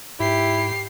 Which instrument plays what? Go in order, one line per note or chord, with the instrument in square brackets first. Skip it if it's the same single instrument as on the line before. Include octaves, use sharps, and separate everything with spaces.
[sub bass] G#2 [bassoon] E4 [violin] G4 C7